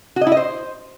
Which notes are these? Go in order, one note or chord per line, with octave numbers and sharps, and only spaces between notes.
F#4
D#5
E4
D#5
C5